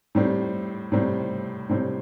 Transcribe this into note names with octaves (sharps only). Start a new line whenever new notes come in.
A2 G3 C4
A2 G3 C4
A2 G3 C4